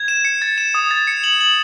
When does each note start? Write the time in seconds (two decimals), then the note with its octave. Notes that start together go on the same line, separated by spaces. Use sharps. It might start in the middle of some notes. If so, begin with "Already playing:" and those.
Already playing: G#6
0.08 E7
0.25 C#7
0.42 A6
0.58 E7
0.75 D#6
0.91 A6
1.07 C#7
1.24 F#7
1.40 F#7